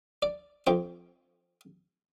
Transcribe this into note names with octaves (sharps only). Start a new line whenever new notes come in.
D5
F2 F3 G5